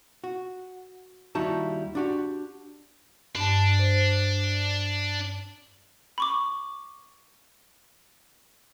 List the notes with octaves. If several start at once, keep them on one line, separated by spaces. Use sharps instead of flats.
F#4
D#2 G3 D#4 E4 F#4 A5
D4 F#4 G4
G2 D4 A5
C5
B5 C#6 D6